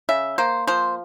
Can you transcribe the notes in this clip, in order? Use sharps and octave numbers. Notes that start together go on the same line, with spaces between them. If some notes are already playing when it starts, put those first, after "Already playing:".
C#3 E5
A#3 C5
F3 C5